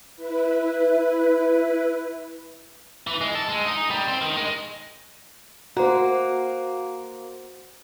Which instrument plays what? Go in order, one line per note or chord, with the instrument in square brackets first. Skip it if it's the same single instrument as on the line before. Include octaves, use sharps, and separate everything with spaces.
[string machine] E4 B4
[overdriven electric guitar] E3
G#3
A4
G#3
D#4
G3
C4
D#3
G#3
[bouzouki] A#3 [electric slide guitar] F#4 C5